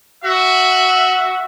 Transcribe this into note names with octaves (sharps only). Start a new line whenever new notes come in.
F#4 E5